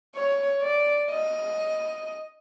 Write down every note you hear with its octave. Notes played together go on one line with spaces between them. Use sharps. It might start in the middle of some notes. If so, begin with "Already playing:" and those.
C#5
D5
D#5